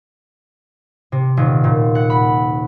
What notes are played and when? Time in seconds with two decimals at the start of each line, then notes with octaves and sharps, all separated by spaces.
1.12 C3
1.37 D#1
1.64 A#2
1.95 F#5
2.10 B5